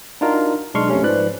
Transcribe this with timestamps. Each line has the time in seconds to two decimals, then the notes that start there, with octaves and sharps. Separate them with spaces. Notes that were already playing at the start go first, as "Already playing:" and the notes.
0.21 D4 D#4 F4 F#4 A#4
0.74 B1 G#3 D4 C6 C#6 F6
0.88 F2 A3 C#4 G4
1.02 G#2 F3 B4 D5 F#6